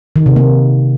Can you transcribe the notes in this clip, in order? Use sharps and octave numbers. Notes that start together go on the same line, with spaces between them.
D#3
C3
A#3